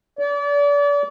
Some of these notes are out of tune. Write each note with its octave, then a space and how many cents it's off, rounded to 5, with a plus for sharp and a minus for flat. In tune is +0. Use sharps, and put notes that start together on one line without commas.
D5 -35